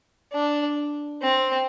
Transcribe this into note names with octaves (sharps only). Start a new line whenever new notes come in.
D4
C4